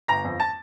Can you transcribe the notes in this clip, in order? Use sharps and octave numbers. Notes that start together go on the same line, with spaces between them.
G1 A#5 A#6
F2
A5 A6